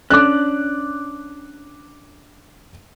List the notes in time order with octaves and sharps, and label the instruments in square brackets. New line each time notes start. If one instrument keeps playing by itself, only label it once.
[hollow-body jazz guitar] C#4 D4 [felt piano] D6 F#6